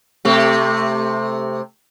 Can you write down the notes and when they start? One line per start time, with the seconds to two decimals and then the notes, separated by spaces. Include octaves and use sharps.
0.25 C3 A3 G4